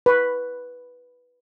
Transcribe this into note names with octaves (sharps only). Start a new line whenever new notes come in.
B4 C#6